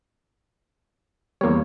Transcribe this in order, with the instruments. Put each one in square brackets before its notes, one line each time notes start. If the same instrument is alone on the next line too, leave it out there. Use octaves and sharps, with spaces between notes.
[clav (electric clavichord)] E2 C#5 [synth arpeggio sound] G3 A#3